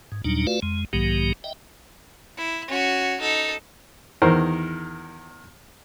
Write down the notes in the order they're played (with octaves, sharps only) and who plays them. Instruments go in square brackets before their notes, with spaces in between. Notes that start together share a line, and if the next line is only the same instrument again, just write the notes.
[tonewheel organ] G#2
D#2 A#2 F#3 G3 D4 D#4
A3 F4 F#4 B4 D5 F5
F2 G#3
B1 G#2 D#3 F#3 A#3 G4
D#5 E5 G5
[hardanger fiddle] E4
C#4 F#4
D#4 A4
[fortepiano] E2 D#3 A#4 C5